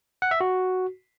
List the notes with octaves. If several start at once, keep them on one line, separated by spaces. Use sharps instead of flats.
F#5
E5
F#4